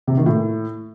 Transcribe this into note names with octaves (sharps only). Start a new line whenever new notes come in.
C3
D#3
A2